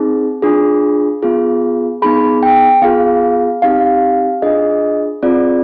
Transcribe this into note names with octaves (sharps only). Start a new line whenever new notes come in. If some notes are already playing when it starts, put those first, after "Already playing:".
Already playing: C4 D#4 G#4
D4 F4 G#4
B3 F4 G#4
B3 D#4 G#4 B5
G5
B3 F4 G#4 F5
C4 D#4 G4 F5
D4 F4 G#4 D#5
C4 F4 G#4 D5